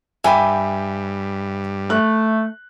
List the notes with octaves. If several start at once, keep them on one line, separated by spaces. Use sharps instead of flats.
G2 E5 G5 G#5 B5 D6
A3 F#6